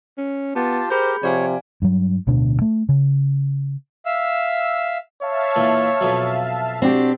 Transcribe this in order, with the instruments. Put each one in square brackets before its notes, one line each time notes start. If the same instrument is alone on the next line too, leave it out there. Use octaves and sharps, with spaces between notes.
[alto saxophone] C#4
[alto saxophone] B3 [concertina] F4 G4 A5
[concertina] G4 A#4 [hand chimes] G#4 B5 G6 [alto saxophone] C5
[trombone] C3 [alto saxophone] F3 [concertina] C#5 [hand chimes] D5 F5 G#5
[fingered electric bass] G2 F#3
D1 D2 B2 D4
A3
C#3
[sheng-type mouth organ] E5 F5 E6
[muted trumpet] C#5 [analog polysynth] E5 F5 A5
[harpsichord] A#2 E3
F2 B2 F#3
[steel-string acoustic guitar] C4 D4 G4 [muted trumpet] F#4